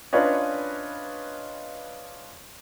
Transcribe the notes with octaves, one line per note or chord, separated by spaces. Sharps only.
C#4 D4 F4 B4 C#5 D#5